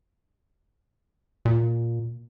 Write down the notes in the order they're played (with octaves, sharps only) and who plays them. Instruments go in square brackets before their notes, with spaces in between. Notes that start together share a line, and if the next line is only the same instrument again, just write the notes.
[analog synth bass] A#2